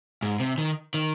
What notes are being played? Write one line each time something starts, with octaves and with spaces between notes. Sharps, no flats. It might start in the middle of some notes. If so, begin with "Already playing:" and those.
G#2
C3
D#3
D#3